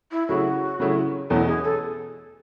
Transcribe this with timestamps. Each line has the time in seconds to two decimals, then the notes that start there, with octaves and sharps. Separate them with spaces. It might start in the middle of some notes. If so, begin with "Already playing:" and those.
0.11 E4
0.28 C#3 F#3 A3 E4 F#4 G#4
0.80 C#3 F#3 A3 E4 G#4
1.30 E2 B2 A3 C#4 E4
1.47 G#4
1.64 A4